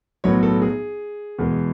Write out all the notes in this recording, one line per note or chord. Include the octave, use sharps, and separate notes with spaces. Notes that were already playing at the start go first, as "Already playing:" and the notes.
B1 A2 F#3 B3 C#5
A4
G#4
E2 B2 G#3